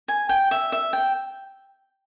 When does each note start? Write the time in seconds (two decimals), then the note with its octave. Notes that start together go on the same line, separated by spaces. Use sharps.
0.08 G#5
0.29 G5
0.51 E5
0.72 E5
0.93 G5